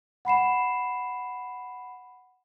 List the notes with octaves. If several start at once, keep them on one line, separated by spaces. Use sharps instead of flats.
F#5 B5 C7 E7